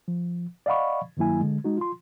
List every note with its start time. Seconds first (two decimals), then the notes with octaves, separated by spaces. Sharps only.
0.08 F3
0.66 D5 D#5 F5 F#5 B5 C#6
1.17 G2 D#3 F#3 A#3 E4 G#5
1.40 D3 G#3
1.64 G#3 D#4 F#4
1.78 F4 C6